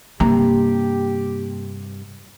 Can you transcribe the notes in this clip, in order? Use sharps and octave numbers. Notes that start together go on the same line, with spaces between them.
G2 C3 A#3 G4 A#5